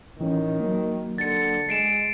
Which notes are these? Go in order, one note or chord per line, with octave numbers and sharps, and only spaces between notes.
A2 D#3 E3 C#4
F#3 A#3
D3 A6 C#7
G#3 C7 D7 E7